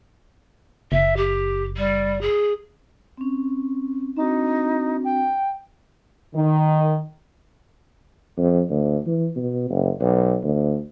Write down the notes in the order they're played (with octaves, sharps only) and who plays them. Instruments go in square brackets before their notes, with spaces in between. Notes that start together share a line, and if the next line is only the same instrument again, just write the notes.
[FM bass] F#1 [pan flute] E5
[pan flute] G4
G3
G#4
[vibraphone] C4 C#4
[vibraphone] C4 D4 F#4 [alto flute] D#4
[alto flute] G5
[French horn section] D#3
[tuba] F2
D2
E3
B2
F#1
B1
D2